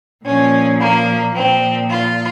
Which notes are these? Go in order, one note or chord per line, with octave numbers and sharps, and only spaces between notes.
A#2 F3 C#4
A#3
A#2 F3 C4
F4